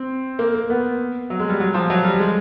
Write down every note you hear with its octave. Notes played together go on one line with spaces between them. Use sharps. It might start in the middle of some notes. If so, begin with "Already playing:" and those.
Already playing: C4
A#3
A#3
B3
F#3
G#3
G3
F#3
F3
F#3
G3
G#3